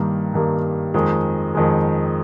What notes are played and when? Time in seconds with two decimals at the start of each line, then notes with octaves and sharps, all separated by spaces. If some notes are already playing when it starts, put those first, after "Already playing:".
Already playing: G2 D#3 G3 A#3
0.34 G2 D#3 G3 A#3
0.94 F2 D#3 G#3
1.55 F2 D#3 G#3